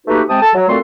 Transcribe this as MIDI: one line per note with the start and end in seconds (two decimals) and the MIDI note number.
0.07 0.22 57
0.07 0.22 58
0.07 0.22 63
0.07 0.22 66
0.07 0.22 67
0.07 0.22 71
0.29 0.38 48
0.29 0.38 56
0.29 0.38 60
0.29 0.38 79
0.29 0.38 81
0.29 0.38 87
0.41 0.50 69
0.41 0.50 81
0.55 0.68 54
0.69 0.78 46
0.69 0.78 57
0.69 0.78 60
0.69 0.78 66
0.69 0.78 69
0.69 0.78 84